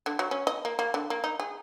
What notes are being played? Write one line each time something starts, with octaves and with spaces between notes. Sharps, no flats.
D3
F#3
C#4
D#5
A#3
A#3
D3
A#3
D#4
G#4